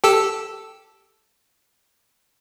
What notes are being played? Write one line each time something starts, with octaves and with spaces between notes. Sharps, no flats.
G4 A4 E6